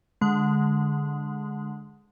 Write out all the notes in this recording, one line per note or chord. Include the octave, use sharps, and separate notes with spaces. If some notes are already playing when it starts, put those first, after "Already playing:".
D3 G#3